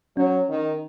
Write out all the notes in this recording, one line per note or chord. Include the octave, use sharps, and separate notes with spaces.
F#3 C#4
D#3